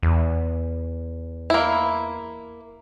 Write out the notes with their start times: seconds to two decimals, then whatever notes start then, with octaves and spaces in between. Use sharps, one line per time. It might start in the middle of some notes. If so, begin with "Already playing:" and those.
0.03 E2
1.50 A#3 E4